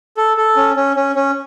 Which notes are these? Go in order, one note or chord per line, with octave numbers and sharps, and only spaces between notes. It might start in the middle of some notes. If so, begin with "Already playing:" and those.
A4
A4
C#4
C#4
C#4
C#4